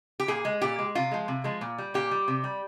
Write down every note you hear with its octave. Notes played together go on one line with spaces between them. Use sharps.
G4
A#2 G#4
G#3
A#2 G4
G#3
C3 F4
F3 G#3
C3
F3 G#3
A#2
G3
A#2 G4
G3
C3
G3